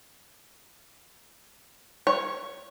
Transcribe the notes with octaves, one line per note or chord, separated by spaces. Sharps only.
C#5